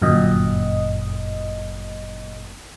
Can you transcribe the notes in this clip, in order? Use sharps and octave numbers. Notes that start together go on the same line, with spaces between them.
G1 F#2 A#2 D#5